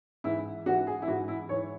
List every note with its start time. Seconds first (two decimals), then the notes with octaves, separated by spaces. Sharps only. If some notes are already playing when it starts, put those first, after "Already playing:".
0.24 G#2 E3 E4
0.66 G#2 E3 F#4
0.87 G#4
1.02 E4
1.07 G#2 E3 F#4
1.28 E4
1.49 G#2 E3 C#5